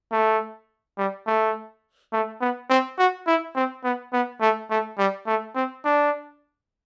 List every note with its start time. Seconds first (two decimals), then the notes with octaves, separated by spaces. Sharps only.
0.12 A3
0.98 G3
1.27 A3
2.13 A3
2.41 B3
2.69 C4
2.98 F#4
3.27 E4
3.56 C4
3.84 B3
4.13 B3
4.41 A3
4.70 A3
4.98 G3
5.27 A3
5.55 C4
5.85 D4